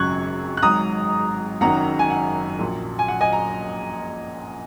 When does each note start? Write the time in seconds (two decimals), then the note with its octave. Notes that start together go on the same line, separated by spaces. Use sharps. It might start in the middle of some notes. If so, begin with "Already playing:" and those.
Already playing: G#1 F#2 C#3 F#3 C#6 F#6 G#6
0.57 F#6
0.62 G#1 G#2 F#3 A#5 D#6
1.61 F#1 F#2 D#3 F#3 F#5 A#5
1.99 G#5
2.10 F#5
2.59 A#1 A#2 F#3
2.99 G#5
3.08 F#5
3.21 D#5 G#5
3.33 A#5